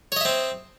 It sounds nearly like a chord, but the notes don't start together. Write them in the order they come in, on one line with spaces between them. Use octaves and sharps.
C#5 D#5 E5 C4